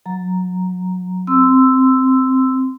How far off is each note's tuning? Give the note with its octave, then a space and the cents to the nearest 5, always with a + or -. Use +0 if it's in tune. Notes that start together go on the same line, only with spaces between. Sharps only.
F#3 -20 A#5 +0
C4 +0 C6 -15 E6 +0